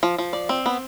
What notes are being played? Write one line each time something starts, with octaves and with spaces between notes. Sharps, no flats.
F3
F3
D5
C4
B3